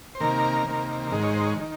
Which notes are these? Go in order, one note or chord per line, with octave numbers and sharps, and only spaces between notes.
C5
C3 D#3 A#3 A#4
C3 D#3 A#3
G#2 D#3 G#3 A#4
C#5
C5
C#5
D#3